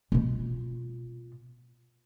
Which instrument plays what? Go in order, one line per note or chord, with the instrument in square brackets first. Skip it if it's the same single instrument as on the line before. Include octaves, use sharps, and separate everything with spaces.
[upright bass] B2 F4